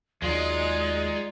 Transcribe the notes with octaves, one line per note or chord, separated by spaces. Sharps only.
D#2 F#3 G#3 D#4 F4 D5